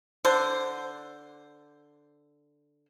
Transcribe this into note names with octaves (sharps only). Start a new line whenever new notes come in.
D3 C5